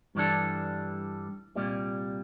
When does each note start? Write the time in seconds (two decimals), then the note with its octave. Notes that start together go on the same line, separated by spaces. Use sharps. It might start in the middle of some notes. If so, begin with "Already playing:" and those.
0.15 G2 E3 G3 D4 A4
1.56 C2 A#2 G3